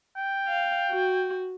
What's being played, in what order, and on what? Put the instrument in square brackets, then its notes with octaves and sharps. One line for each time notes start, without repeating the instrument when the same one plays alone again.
[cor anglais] G5
[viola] F5
F#4